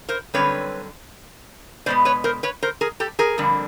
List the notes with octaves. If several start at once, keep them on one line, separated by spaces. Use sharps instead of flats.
A#4 C5
F#2 D3 G3 C4 B4 C#5
B2 G#3 B3 C5 D5
B4 C#5
A#4 C5
B4 C#5
A#4 C5
G#4 A#4
G4 A4
G#4 A#4
F2 D3 G3 A#3